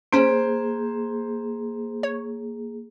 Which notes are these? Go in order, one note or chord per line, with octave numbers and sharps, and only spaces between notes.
A#3 C#4 G#4 C5 B6
C#5